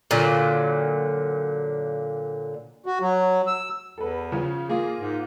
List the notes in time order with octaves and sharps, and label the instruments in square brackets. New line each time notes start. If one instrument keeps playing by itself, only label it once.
[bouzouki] A#2 D3 F#3
[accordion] F#4
F#3
E6
[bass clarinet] E2 [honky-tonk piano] A4 B4
[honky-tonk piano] C#3 F3 C#4
[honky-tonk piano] A#3 F4 [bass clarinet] G#4
[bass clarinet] G#2